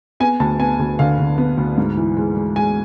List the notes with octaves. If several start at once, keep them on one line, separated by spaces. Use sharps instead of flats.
B3 G#5
D2 A5
B3 G#5
D2
D3 F5
D3
B3
D2
G#2
E3
G#3
G#3
G#3 G#5